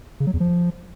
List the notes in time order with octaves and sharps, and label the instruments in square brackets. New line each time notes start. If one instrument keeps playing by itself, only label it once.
[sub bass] C#3
F#3
E2
F3